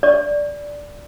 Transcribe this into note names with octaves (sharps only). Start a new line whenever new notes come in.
D5